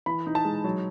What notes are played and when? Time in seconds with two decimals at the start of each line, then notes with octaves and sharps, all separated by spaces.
0.06 E3 B5
0.26 D#4
0.35 A5
0.45 G#3
0.64 F#3